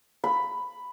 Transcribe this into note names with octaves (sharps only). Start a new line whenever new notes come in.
B5